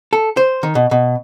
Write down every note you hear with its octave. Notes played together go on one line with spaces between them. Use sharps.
A4
C5
D#3
B2
B2